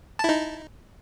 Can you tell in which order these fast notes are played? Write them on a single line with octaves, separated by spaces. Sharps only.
A5 E4 D#4